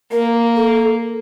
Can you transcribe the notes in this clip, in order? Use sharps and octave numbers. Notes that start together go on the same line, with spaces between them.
A#3 A#4
A4